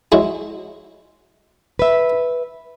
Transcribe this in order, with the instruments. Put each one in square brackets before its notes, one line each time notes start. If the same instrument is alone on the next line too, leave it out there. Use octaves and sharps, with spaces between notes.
[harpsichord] F#3 G#3 E4
[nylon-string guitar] B4 E5